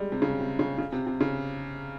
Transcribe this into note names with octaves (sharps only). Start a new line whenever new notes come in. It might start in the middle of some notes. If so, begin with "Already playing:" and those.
Already playing: G3 G#3
C3
C#3
C3
C#3
C#3
C3
C3
C#3